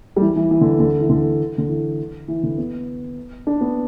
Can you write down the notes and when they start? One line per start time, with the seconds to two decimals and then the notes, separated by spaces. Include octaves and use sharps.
0.16 G3
0.21 E3
0.36 E3
0.51 E3
0.61 D3
0.80 D3
1.01 E3
1.10 D3
1.58 D3
1.69 E3
2.28 E3
2.43 D3
2.58 B3
3.47 D4
3.61 B3